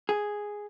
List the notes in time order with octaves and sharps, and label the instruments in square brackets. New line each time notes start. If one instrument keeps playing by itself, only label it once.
[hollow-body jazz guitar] G#4